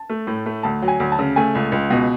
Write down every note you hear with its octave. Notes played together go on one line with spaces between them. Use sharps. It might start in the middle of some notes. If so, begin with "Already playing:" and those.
Already playing: A5
A3
A2
A3
D2 A5
F#3
G#5
D2
A5
C#3
A3 G#5
C#2
C#2
B2